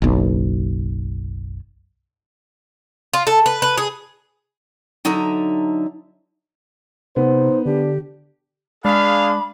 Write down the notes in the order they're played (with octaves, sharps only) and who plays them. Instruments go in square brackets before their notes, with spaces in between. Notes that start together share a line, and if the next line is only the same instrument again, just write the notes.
[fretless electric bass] F#1 B1
[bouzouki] F4
A4
B4
B4
G#4
[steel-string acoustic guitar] D3 F#3 D#4 A4 E5 A#5
[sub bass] C3 [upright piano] B3 [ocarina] D#4 [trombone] C5
[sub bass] D3 [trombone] D4 [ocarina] G4
[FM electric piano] G#3 [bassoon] D4 [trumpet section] G#4 F5 [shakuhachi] B5